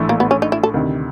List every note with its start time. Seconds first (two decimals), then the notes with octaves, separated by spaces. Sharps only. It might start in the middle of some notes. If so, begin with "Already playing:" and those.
Already playing: A#1 A2 E3 A3
0.09 A#3
0.20 B3
0.31 C#4
0.42 D#4
0.52 E4
0.63 A4
0.74 D2 C3 D#3